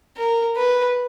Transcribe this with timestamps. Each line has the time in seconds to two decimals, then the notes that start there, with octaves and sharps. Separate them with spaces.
0.17 A#4
0.57 B4